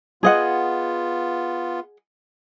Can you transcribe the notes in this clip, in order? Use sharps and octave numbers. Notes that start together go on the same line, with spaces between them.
B3 F4 G#4 D#5 F#5